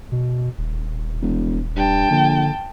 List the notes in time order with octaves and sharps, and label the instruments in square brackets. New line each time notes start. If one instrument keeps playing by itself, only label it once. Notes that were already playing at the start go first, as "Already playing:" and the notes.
[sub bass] B2
D#1
[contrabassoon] E1
[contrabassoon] G2 [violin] G5 A5
[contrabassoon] A#1 [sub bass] D3